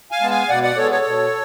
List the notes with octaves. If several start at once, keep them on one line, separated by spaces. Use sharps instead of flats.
F5 G#5
G#3 B3 A5
F5 G#5
B2 D5 F#5
D5 F#5
G#3 B3 A4 C#5
A4 C#5
B2